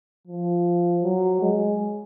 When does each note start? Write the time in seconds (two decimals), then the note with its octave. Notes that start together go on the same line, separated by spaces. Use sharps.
0.27 F3
1.03 F#3
1.42 G#3